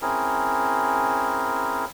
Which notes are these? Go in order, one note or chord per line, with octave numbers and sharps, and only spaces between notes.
C4 C#4 E4 G#4 A#4